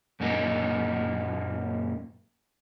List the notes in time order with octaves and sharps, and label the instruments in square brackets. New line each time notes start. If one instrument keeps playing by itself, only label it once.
[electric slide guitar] F#2 A#2 A#3 D#4